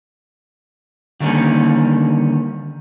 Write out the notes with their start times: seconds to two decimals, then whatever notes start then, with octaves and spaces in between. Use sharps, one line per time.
1.20 D3 D#3 G3 A#3 C#4